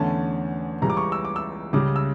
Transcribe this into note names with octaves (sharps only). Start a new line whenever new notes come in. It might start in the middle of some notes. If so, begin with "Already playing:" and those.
Already playing: E2 D3 A3 C#4 A5
C#2 C#3 E3 G3 A#5
D6
C#6
E6
D6
E6
C#2 C#3 G3 D6
E6